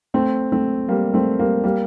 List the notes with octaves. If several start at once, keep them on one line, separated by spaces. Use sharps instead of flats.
A3 C4
A3 C4
G3 A#3
A3 C4
G3 A#3
G3 A#3